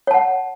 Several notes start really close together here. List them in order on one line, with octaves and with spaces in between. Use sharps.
C#5 A5 F#5